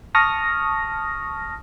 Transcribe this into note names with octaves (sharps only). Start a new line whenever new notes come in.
A5 C#6 D#6 F6 A#6